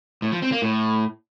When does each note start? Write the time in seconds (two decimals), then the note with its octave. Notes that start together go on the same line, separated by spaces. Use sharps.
0.22 A2
0.32 F3
0.42 C4
0.52 A#3
0.62 A2